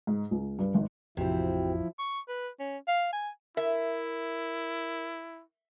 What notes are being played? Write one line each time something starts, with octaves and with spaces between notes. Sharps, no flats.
G#2
C#2
G2
G#1
A1 F2 C3 F3 C4 E4 F#4
C#6
B4
C#4
F5
G#5
E4 A#4 E5